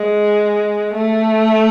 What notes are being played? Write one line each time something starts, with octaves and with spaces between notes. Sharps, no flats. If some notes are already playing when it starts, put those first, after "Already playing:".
Already playing: G#3
A3